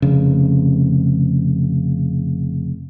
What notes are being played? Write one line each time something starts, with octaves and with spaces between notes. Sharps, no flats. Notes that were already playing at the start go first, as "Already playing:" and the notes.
F1 C#3